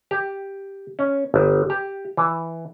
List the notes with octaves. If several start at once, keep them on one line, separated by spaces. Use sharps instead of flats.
G4
C#4
G1
G4
E3